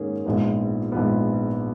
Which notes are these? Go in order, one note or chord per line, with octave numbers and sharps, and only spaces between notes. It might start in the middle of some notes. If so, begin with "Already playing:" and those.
Already playing: G#2 D#3 A#3 C#4 G#4
A#1 G#2 F3 B3
A#1 G#2 F3 B3